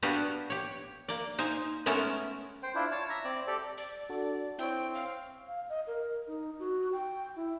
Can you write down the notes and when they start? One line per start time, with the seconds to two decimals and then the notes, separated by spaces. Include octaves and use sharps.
0.03 B3 D4 F#4 G4 B4 F5
0.50 G4 C#5
1.08 A#3 D5
1.38 D#4 C5 F5 G#5
1.86 G#3 A3 B3 C#4 A4 A#4
2.63 C5 G5
2.75 D4 E4 F4
2.91 C#5 A5
3.09 E5 A#5
3.24 C4 D5
3.47 G4 A4 D5
3.78 D5
4.09 D4 F#4 A4
4.59 C4 E4 C#5 G5
4.94 F5
5.47 F5
5.69 D#5
5.87 A#4
6.27 D#4
6.59 F#4
6.93 G5
7.36 E4